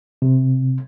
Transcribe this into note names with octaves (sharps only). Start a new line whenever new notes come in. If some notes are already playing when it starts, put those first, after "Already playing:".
C3